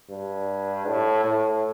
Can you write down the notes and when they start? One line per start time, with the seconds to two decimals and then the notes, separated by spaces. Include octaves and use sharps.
0.09 G2
0.87 A2
1.24 A2